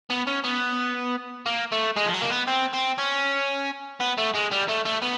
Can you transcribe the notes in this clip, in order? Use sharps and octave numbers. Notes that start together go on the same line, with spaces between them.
B3
C#4
B3
A#3
A3
G#3
F3
F#3
A#3
B3
C4
C4
C#4
B3
A3
G#3
G3
A3
A3
B3